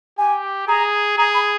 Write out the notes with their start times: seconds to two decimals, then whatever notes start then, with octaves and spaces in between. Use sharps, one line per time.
0.18 G4 G#5
0.68 G#4 A#5
1.17 G#4 A#5
1.34 B5